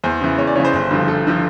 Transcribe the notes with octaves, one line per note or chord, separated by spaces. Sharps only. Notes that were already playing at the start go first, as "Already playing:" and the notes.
E2 C5
C#3 E3
E2 C#5
D5
C#3 E3 C5 C#5
G1
G2 D3 F3
G1 A4
D3 F3